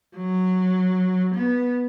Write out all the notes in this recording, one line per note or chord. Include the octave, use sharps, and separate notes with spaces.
F#3
B3